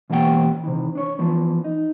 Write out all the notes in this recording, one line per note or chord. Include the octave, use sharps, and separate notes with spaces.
B2 E3 A#3 G4 F#5 G5
C3 D#3 E3
D4 C#5
E3 F3 B3
D#4